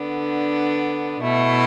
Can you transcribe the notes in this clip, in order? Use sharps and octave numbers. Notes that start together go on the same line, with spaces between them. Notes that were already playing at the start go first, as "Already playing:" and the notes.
Already playing: D3 B3 D4
B2 A3 E4